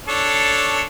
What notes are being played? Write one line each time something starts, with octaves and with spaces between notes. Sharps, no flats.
D4 A4 C#5